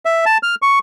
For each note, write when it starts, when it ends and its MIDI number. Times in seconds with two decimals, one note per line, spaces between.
0.05 0.25 76
0.26 0.38 81
0.43 0.55 89
0.62 0.79 85